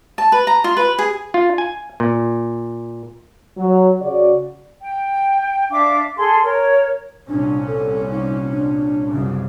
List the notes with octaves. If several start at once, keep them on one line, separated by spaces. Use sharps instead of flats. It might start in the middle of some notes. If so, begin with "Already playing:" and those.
A5
B4
A#5
F4
B4
G#4
F4
G#5
A#2
F#3
C#3 F#4 D5
G5
D4 E5 F5 D6
G#4 A4 C6
A#4 C#5
C2 A#2 C#4 D4
A4
D#4
D4
C2 F#2 C#3